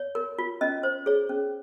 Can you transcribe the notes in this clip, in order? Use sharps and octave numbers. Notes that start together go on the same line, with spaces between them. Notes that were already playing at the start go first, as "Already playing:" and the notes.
Already playing: C#5
A#4
F4
C#4 D#5
C5
G#4 C#5
C#4